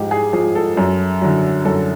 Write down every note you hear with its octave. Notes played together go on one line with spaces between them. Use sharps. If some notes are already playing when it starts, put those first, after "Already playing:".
Already playing: G#2 F3 G4
G#4
F3 G#4
A4
F#2
D3 F#3
F#2 A4